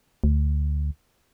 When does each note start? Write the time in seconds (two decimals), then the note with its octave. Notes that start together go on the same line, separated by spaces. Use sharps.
0.24 D2